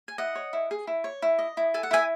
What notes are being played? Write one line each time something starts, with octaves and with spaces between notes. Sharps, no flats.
G#5
E4 D#5 F#5
C#5
E4
G#4
E4
C#5
E4
D#5
E4
A4 G#5
F#5
E4 E5 G#5